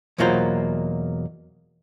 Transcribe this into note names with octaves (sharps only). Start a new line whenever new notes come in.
E2 B2 F#3 A#3 F4 C5